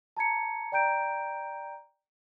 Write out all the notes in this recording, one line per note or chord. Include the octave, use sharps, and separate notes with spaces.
A5 A#5 G#6 C#7
D5 G5 A#5 G6 D7